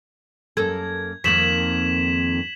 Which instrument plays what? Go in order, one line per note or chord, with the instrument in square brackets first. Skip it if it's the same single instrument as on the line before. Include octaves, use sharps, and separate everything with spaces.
[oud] F#2 A#3 A4 [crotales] G#6
[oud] F2 D#3 A#3 [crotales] B6 E7 F#7